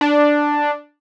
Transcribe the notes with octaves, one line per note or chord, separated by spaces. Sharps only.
D4